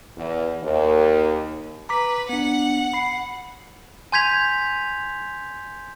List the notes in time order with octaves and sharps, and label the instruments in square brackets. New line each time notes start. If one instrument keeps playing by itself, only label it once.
[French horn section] E2
D#2
[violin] B4 [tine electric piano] A#5 D6 B6
[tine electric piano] B3 D4 [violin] F#5
[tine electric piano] B5 C7
[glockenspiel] G#5 C6 G6 G#6 B6 F7